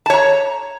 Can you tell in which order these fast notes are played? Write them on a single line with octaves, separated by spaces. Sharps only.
A5 C#5 A#5